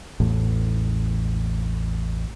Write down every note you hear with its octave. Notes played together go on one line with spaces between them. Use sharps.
A1 E2 A2